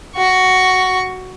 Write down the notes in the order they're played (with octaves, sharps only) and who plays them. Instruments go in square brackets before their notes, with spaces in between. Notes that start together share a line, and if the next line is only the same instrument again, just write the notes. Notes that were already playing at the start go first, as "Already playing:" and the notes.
[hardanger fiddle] F#4 C#6